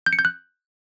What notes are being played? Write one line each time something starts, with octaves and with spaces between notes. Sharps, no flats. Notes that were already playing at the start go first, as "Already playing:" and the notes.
G6
C#7
G6
F#6